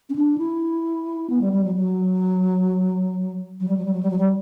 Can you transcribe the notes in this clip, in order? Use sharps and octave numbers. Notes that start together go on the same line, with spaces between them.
C#4
D4
E4
B3
G3
G3
F#3
F#3
F#3
G3
F#3
G3
F#3
G3
F#3
G3